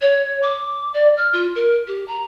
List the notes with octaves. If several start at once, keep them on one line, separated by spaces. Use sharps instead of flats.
C#5
D6
D5
F6
F4
A#4
G4
A#5